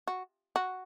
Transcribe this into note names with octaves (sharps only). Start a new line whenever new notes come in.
F#4
F#4